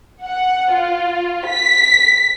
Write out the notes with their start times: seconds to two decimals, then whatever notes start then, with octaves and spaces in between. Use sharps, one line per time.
0.25 F#5
0.72 F4
1.48 B6